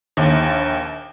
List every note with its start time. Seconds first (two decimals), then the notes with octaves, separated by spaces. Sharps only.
0.17 A#1 D#2